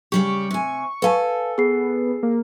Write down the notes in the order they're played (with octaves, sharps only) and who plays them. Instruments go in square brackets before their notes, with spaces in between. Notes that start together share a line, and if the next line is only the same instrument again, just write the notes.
[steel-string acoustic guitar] C#3 G3 G4 [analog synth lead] C#6
[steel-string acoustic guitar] C3 G#5
[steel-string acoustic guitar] A4 G#5 [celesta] B4 F5 A5
[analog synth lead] B3 [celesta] G#4 C7
[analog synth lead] A#3